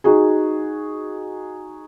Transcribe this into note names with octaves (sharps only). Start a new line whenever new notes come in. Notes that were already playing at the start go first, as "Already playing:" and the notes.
D#4 F#4 G#4